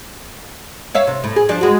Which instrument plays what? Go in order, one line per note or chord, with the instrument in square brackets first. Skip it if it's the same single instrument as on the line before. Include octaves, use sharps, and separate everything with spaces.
[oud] C#5 E5 F5
C3
A2
G#4
F3 D4
G#3 F#4